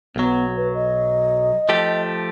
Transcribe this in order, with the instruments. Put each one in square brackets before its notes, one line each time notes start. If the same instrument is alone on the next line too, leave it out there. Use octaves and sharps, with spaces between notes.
[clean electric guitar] B1 F#3 [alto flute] B3
[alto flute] B4
D#5
[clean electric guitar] F3 A3 G4